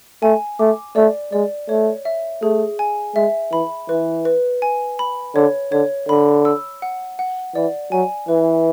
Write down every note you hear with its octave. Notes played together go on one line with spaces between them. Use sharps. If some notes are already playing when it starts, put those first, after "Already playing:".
A3 G#5
A3 D6
A3 D5
G#3 D5
A3 C#5
E5
A3 G#4
G#5
G#3 E5
E3 B5
E3 B4
B4
G#5
B5
D3 C#5
D3 C#5
D3 B5
E6
F#5
F#5
E3 D5
F#3 G#5
E3 B4